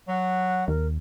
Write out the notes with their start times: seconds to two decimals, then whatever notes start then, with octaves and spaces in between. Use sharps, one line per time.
0.08 F#3 F#5
0.68 D#2 A#4